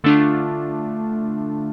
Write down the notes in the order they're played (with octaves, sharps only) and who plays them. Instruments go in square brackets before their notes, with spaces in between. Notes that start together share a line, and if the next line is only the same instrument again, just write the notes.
[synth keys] D3 A3 D4 F4